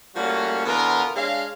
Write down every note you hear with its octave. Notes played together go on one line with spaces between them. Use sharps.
F3 G3 A3 A#3 C#4 F#4
B2 D3 E3 B3 F4 A#4
G#3 D4 C#5 F5